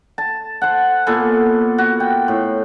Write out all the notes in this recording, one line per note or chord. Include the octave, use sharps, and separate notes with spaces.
A5
C5 F#5
A#2 B3 A4 G#5
F#4
G5
A2